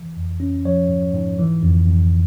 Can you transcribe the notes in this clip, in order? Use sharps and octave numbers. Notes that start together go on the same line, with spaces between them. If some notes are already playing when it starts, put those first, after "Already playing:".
Already playing: E3
F2
C#4
F3 C#5
G#2
G#2
E3
F2
F2